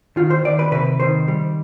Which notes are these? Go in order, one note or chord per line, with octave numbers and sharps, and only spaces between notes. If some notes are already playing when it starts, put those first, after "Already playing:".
D#3 F4
C5
D#3 D5
B4
C3 B4
D#3 C5
G3